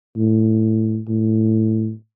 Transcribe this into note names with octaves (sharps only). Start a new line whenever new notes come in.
A2
A2